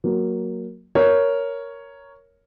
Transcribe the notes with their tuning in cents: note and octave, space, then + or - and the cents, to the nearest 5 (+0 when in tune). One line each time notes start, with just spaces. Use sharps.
F#3 +0 A#3 +0
A#4 +0 C#5 +5